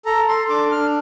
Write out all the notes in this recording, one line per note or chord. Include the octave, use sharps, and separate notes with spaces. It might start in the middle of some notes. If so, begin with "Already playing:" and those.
A4 A#5
A4 C6
D4 D6
D4 F6